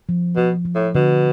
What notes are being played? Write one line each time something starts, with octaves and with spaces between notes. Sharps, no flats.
F3
B2 F3
F3
A2
B2 D3